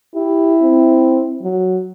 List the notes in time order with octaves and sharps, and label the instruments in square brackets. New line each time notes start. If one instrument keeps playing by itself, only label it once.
[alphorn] E4 [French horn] G4
[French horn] C4
F#3